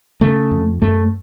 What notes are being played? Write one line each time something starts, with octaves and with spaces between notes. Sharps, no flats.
C#3 A3
F2
F#2 A3